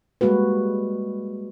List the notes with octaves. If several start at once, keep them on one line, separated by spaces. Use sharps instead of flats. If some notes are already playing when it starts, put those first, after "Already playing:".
G3 G#3 A#3 F#4 B4